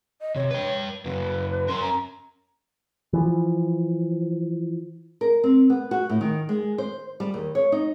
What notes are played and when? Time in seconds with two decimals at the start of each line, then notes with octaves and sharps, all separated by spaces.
0.21 D#5
0.36 C3 C#5
0.51 B4 G5
1.05 F#2 C#3 B4
1.68 C#4 A#4 C6
1.82 A#5
3.13 E3 F3
5.21 A#4
5.44 C4
5.70 B3
5.91 F#4
6.09 A2
6.21 D#3
6.49 G#3
6.78 C5
7.20 G3
7.34 D#2
7.55 C#5
7.72 D#4